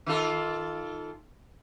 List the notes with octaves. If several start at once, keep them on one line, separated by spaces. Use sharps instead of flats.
D#3 F4 A4